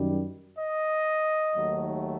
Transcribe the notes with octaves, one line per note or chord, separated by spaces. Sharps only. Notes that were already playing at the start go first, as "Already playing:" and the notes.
Already playing: F#2 D#3 G3
D#5
D#2 D#3 F#3 A3